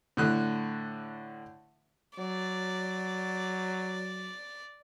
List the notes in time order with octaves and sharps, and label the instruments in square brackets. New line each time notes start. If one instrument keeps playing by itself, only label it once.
[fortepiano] A2 D3 F#6
[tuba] F#3 [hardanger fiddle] D5